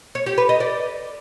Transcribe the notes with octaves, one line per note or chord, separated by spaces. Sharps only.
C#5
G4
B4
D#5
D5